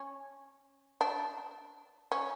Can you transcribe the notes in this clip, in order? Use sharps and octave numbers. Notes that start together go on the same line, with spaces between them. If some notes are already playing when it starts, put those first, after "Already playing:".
Already playing: C#4
D4
C#4